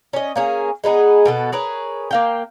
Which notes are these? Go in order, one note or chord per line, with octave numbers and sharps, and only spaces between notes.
C#4 D#5
A#3 C#4 G#4
G#3 B3 D#4 G#4
B2 B3 A4
G#4 A#4 B4 C#5
A#3 F5 G5